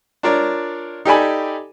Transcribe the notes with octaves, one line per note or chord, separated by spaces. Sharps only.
D4 F4 A#4 C#5 D5
D#4 G4 A4 D5 G#5 B5